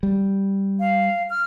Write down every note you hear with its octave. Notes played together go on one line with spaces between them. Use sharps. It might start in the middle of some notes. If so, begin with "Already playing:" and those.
G3
F5
F6